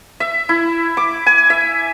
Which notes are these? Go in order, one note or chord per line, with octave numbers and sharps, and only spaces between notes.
E5
E4
D6
G#5
E5